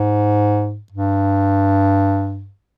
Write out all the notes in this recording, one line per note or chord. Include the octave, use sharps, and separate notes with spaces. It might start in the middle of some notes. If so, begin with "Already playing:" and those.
Already playing: G#2
G2